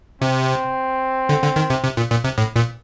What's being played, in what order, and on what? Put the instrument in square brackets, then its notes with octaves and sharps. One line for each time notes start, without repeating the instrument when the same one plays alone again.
[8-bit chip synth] C3 [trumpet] C4
[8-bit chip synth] D3
D3
D#3
C3
C3
A#2
A#2
C3
A2
A#2